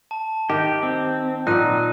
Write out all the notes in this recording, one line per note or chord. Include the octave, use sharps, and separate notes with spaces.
A5
D#3 G4
C4
A#2 D#4 F#5 F#6 D#7